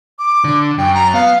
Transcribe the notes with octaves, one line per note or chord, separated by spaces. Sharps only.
D6
D3
F#2 G5
A#5
B3 F5